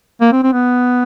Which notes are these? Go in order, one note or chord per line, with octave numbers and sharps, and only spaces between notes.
A#3
C4
C4
B3